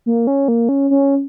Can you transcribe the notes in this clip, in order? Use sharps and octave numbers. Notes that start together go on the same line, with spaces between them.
A#3
C#4
A#3
C#4
C#4